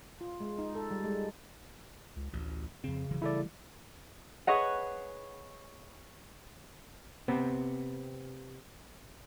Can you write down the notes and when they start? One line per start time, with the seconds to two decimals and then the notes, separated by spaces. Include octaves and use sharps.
0.21 F4
0.40 G#3
0.58 D#4
0.75 A4
0.91 G3
1.04 G#3
2.16 C#2
2.33 A1 D2
2.84 F2 C#3 C4
3.11 E1 E3 F#3
3.22 E3 G3 A3 E4 A4 D5
4.47 G#4 B4 C#5 D#5 F#5
7.28 C3 B3 C4